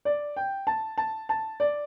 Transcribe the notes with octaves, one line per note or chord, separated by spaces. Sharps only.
D5
G5
A5
A5
A5
D5